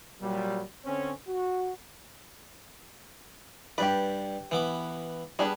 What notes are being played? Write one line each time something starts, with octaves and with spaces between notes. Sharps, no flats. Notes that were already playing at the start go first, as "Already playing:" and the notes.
A#2 F#3 G3
D3 C4 C#4
F#4
G2 G4 B4 D5
E3 B3 D6
G3 B3 D4 G#4